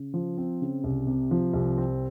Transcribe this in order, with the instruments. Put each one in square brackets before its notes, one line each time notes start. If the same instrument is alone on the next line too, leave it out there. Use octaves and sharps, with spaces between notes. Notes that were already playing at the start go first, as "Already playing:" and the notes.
Already playing: [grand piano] C#3
F3
C4
C#3
C2
C3
F3
C2
C4